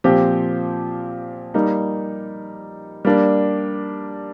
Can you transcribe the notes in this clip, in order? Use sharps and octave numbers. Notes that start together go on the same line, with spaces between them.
A#2 F3 C4 G4
G3 A#3 D#4
G3 A#3 D4